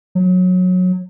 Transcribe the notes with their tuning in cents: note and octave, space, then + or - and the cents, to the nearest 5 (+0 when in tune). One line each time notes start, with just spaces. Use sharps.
F#3 -20